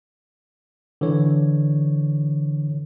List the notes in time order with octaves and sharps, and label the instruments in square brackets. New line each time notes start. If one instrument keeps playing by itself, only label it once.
[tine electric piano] D3 E3 C#5